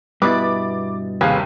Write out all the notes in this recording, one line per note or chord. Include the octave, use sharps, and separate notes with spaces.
G2 B2 E4 B4 D6 A6
D#2 C3 G#4 B4 F5